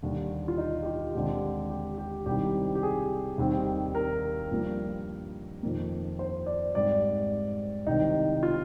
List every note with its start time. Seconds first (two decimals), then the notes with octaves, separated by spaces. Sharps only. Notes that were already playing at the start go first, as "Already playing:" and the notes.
0.02 D#2 D3 G3
0.48 F4
0.58 D#4
0.83 G4
0.86 F4
1.14 D#2 D3 G#3 C4 G4
1.70 G4
1.98 G4
2.26 C2 C3 D#3 G3 G4
2.75 G4
2.83 G#4
3.38 D#2 D#3 G3 C4
3.95 A#4
4.51 G2 F3 A#3
5.63 F2 D#3 A#3
6.19 C5
6.46 D5
6.74 G#2 G3 C4 D5
7.86 C2 C3 D#3 D#4
8.43 F4